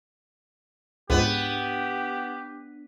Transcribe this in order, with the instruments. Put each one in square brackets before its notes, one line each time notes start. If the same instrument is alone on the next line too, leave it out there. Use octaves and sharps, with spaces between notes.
[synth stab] C#2 G#2 [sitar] B3 [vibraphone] D4 [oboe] G4